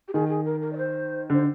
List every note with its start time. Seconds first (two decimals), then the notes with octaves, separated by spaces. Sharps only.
0.08 G4
0.13 D#3 G#4
0.29 G#4
0.45 A#4
0.61 A#4
0.73 D5
0.77 C5
1.30 D3 C5